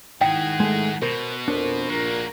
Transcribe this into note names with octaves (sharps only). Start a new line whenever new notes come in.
G#2 D#3 E4 G#4 F#5 G5
G#3 A3
B2 A#4 C5
F2 D4 A#4 C5
A#1 A#2 A#3 F#4 A#4